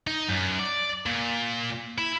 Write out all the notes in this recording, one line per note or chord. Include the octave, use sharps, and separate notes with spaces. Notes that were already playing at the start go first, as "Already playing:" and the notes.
D#4
F#2
D5
A#2
E4